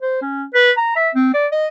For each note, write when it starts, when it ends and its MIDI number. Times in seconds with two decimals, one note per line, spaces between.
0.02 0.21 72
0.22 0.44 61
0.54 0.72 71
0.77 0.92 82
0.96 1.10 76
1.15 1.29 60
1.34 1.47 74
1.52 1.68 75